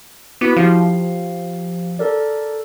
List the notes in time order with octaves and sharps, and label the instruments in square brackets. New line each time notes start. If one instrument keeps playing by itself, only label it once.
[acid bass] B3 [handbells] E4 F#4 D6
[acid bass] F3 [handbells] G4 F5
[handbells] A4 A#4 D5